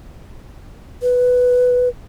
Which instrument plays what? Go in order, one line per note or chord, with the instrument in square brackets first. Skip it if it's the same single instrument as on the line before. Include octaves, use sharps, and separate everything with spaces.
[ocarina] B4